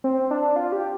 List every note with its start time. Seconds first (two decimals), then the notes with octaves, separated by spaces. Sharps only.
0.04 C4
0.31 D4
0.56 F4
0.72 G4